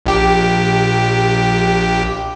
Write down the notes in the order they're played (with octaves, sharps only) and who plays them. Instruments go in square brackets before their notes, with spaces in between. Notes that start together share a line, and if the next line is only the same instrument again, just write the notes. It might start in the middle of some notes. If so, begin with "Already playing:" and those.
[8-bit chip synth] A#1 G4